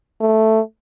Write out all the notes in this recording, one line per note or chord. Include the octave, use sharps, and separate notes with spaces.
A3